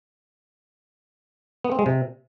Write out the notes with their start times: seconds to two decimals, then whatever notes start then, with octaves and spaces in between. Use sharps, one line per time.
1.64 B3
1.72 C4
1.79 G#3
1.86 C3